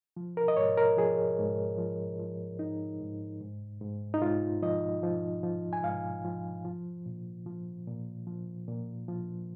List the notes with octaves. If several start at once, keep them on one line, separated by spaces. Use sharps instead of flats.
F3
A#4
D#5
G#2 C#5
A#4
F3 G#4
G#2
F3
F3
G#2 D#4
G#2
G#2
G#2
D#4
G#2 F4
F3 D#5
F3
F3
G#5
G#2 F5
F3
F3
A#2
F3
A#2
F3
A#2
F3